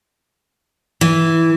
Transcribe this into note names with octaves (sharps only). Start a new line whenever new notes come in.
E3